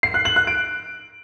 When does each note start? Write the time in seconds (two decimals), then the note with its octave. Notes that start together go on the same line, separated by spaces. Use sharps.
0.03 C7
0.14 F#6
0.25 F#7
0.36 F#6
0.47 D7